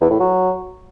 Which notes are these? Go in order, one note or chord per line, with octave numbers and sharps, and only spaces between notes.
E2
A2
F#3